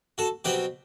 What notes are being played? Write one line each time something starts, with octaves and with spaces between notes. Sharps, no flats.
F#4 A4
B2 F#3 C4 G4 B4